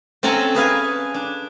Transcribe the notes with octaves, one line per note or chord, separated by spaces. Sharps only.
C4 C#4 A4 F#5 G#5 A#5
G#4 B4 F5 G#5
D4